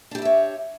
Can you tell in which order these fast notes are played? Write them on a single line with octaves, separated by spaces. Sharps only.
D4 G4 E4 E5 C#5